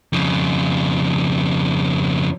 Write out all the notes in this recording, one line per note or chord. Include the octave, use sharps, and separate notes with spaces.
F2 C#3